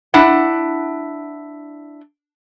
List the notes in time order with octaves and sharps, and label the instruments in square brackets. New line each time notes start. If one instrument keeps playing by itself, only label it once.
[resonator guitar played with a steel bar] D4 E4 F#5